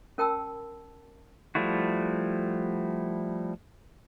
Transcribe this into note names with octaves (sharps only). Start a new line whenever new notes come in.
C#4 A#4 G5 A5 B5 E6
F3 G3 A3 E4 F#4